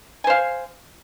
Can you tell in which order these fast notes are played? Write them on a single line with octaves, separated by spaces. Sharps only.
G#5 C5 F5